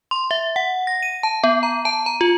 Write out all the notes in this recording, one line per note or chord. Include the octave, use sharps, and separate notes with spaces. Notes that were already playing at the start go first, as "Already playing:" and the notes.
C6
E5
F#5
A#6
D#7
A5
B3
A#5
A5
A#5
F4